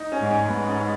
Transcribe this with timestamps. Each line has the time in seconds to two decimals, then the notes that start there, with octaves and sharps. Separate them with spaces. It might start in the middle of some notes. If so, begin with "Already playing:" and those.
Already playing: D#4
0.12 C#4
0.21 G#2
0.30 C#4
0.48 G#2 B3
0.68 C#4